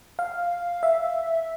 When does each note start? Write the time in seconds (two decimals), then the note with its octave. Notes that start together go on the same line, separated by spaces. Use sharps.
0.19 F5
0.83 E5